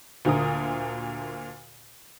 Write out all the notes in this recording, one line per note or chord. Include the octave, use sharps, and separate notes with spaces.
D2 A#2 D3 A#4 D#6